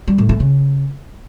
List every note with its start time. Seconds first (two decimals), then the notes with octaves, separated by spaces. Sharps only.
0.08 G3
0.18 A2
0.29 A3
0.40 C#3